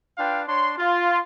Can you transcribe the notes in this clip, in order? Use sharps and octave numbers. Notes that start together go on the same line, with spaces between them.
D4 F4 B4 F5 G5
D4 C#5 C6
F4